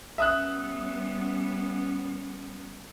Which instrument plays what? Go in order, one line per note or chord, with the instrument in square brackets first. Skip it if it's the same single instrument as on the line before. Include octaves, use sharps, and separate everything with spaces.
[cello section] G3 B3 C#4 [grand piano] E5 D#6 F#6